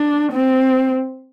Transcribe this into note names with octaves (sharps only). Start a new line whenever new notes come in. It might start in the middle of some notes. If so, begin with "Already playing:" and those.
Already playing: D4
C4